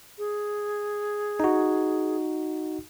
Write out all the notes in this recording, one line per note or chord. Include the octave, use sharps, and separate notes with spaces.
G#4
D#4 F#4